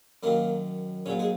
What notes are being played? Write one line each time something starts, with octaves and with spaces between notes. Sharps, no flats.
F#2 D#3 F#3 A#3 A#4
A#1 A#2 F#3 C#4 C#5
G#3 G#4